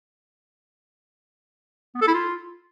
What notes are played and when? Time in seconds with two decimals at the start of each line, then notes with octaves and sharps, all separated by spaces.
1.95 B3
2.01 A4
2.08 E4
2.14 F4